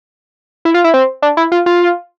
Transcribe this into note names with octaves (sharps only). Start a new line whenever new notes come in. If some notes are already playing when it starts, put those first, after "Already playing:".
E4
F4
E4
C4
D4
E4
F4
F4